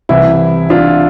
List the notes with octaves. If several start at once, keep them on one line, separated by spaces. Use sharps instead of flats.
C2 C3 E3 E4
D4 F4